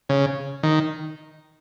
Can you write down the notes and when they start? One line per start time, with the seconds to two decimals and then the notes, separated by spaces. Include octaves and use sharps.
0.09 C#3
0.63 D#3